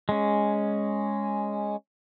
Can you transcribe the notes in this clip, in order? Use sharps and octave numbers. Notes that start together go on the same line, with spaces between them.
G#3 C#4